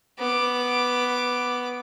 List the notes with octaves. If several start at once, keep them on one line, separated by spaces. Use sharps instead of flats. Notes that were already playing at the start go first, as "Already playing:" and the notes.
B3 D6